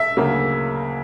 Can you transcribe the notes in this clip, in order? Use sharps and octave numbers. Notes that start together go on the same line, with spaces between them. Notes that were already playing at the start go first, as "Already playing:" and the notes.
Already playing: E5
D2 C#3 F#3 A#3